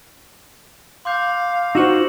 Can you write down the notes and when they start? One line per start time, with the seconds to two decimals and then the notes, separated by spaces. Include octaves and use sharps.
1.05 F5 C6 D6 G6
1.75 D#4 F4 F#4 C5 C#6 E6 E7 F#7